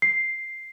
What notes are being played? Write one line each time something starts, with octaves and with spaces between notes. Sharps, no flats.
C7